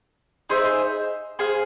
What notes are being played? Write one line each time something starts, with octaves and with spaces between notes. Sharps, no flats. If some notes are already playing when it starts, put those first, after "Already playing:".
D#4 G#4 C5 E5
G#4 C5 F5